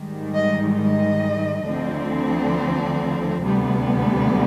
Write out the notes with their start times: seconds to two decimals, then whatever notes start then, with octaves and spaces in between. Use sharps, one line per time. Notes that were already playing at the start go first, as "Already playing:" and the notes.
Already playing: G#2 D#3 G3
0.35 D#5
0.79 D#5
1.66 D2 D3 F3 C4
3.42 D2 C3 G3 B3